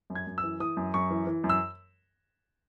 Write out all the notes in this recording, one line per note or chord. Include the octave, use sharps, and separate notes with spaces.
F#2
G#6
F#2
E6
E3
E3 D#6
F#2
F#2 C#6
E3
E3
F#2
E6